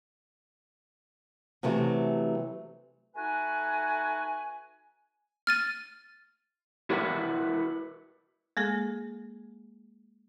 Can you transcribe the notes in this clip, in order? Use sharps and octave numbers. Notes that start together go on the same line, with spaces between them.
C3 E3 F#3 A3
A3 D#4 F#4 B4 G#5
F6 A6 D#7
E4 F#4 A#4 B4 E5 F#5
G#3 A#3 G#4 A4